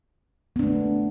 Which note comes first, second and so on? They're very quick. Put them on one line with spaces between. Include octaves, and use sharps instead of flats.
B3 D4 A3